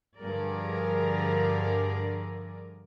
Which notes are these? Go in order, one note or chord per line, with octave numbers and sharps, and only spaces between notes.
G2 D3 F3 G#4 A#4 D5